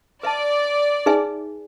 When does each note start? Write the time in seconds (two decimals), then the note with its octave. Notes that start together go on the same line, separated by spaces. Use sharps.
0.23 B4 D5 E5 A5
1.06 D#4 G#4 B4 E5 G#5